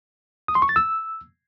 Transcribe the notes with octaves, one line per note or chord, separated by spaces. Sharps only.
D#6
C6
C#6
A6
E6